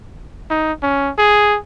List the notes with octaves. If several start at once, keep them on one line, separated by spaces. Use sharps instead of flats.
D#4
C#4
G#4